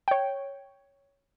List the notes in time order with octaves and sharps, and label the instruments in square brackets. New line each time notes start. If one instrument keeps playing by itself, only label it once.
[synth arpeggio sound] C#5 G5